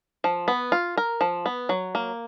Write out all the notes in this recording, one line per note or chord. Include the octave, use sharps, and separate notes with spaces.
F3
B3
F4
A#4
F3
B3
F#3
A#3